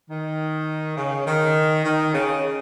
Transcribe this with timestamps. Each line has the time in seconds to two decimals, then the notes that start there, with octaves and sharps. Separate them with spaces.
0.10 D#3
0.97 C#3
1.26 D#3
1.85 D#3
2.14 C#3